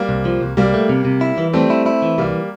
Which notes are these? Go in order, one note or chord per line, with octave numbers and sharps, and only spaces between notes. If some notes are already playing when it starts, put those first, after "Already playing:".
Already playing: G3 A#3
C2
F3
C2
C2 G3 A#3
A3
C3
C3
E4
E3
G3 A3 C4
E4
E4
E3
C2 G3 A#3